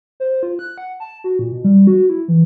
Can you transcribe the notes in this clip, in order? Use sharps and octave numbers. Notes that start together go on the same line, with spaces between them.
C5
F4
F#6
F#5
A5
F#4
A#2
B2
G3
F#4
E4
E3